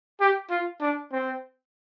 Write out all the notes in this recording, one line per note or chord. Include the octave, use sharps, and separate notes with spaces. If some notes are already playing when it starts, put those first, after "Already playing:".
G4
F4
D4
C4